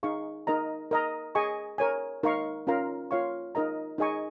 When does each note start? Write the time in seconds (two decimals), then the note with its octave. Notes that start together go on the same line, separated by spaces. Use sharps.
0.03 D#4 G#4 F5 C#6
0.47 D#4 A#4 D#5 A#5
0.91 A#4 D#5 A#5
1.35 G#4 D#5 G#5 C#6
1.78 A#4 C#5 G#5
2.23 D#4 A#4 F5 C#6
2.67 C#4 F4 A#4 F5 A#5
3.11 F4 C#5 F5 C#6
3.55 D#4 A#4 D#5 A#5
3.98 D#4 G#4 D#5 G#5 C#6